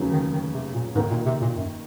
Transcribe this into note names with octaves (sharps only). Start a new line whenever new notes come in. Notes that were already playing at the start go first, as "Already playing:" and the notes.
Already playing: F1 D#2 C#3 F#3 C#4
D#3
D#3
C3
A#2
D#2 G#2 D#3 A#3
A#2
C3
A#2
F#2